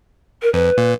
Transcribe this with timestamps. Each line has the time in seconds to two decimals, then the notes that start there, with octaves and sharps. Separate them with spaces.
0.42 A#4
0.54 F2 B4
0.77 A#2